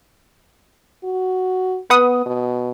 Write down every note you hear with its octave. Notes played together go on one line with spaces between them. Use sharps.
F#4
B3 B4 F#5 D#6
B2